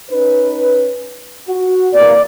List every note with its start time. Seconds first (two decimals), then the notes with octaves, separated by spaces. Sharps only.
0.11 C#4 D#4 B4
1.48 F#4
1.94 E2 C3 A#3 D5